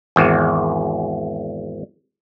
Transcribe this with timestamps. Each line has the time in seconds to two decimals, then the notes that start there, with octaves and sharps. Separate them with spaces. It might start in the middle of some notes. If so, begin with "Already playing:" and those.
0.16 G#1 E2